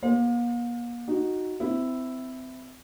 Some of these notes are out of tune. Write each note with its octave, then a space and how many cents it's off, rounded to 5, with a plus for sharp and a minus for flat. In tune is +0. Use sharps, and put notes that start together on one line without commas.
A#3 +40 C5 +0 F5 +40
D#4 +0 F#4 +0
C4 -30 E4 +0